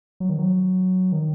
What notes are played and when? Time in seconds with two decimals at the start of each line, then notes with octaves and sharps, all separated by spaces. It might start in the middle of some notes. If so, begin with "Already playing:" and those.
0.20 F#3
0.30 D#3
0.39 F#3
1.12 D#3